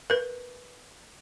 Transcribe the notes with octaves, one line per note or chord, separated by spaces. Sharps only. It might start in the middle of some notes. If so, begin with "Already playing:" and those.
A#4 B4